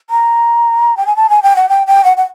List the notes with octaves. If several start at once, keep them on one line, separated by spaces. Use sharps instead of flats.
A#5
G5
G#5
A5
G#5
G5
F#5
G5
G5
F#5
F#5